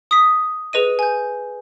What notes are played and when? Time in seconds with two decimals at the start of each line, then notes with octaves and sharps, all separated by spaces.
0.11 D#6 B6
0.73 G#4 B4 D#5 D#7
0.99 G#5 G6